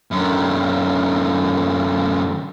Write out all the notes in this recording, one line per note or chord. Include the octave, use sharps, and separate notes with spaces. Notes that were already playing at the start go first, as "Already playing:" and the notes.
F#2 D3